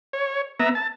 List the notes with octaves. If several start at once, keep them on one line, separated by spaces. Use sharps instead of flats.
C#5
B3 E5 A#5
A5